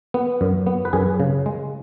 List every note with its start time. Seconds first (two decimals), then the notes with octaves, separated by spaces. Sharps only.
0.14 B3
0.41 F#2
0.66 B3
0.85 B4
0.93 F#2 G#4
1.20 C#3
1.46 G#3